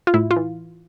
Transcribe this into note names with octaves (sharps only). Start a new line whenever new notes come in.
F4
A2 E4
F4
E3